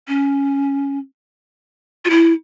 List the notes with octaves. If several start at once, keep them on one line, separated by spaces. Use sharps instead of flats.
C#4
F4
E4